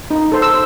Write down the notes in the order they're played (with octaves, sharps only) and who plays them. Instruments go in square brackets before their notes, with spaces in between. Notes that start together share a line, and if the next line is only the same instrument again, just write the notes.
[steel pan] D#4
A4 C5
E6